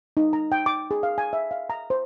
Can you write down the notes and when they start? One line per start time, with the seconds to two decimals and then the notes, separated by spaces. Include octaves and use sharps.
0.17 D#4
0.33 A#5
0.52 G5
0.66 D6
0.91 G#4
1.03 F5
1.18 G#5
1.33 E5
1.51 F5
1.70 A#5
1.90 C5